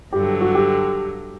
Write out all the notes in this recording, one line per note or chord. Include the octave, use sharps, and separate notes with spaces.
G2 D3 F#3 G4
F#4
G4